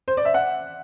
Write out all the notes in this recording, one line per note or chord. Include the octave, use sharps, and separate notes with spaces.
C5
D5
E5
F#5